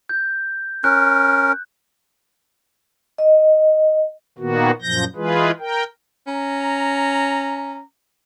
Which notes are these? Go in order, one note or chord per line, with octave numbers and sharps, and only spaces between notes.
G6
C#4 A#4 F#6
D#5
A#2 D#3 A#3 B3 F#4
F#2 A#2 F3 G6 A#6
E3 G#3 F4 G#4 B4
A#4 G5
C#4 A#5